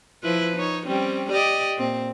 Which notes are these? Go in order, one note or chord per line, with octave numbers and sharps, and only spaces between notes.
F3 E4 B4
D#4 C#5
G3 C4 C#4
G4 D5 D#5
A#2 C4